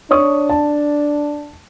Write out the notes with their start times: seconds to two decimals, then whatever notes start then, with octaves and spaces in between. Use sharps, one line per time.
0.11 D4 C#5 C#6 D#6
0.50 A5